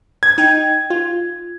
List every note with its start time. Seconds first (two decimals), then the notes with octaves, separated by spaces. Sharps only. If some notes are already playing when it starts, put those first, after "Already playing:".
0.23 G#6
0.38 D#4 G5
0.90 F4